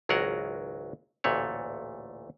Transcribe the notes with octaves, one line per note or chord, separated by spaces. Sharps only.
G#1 C#2 F#3 G#4 A#4 F#5
A1 D2 A#2 A3 C#5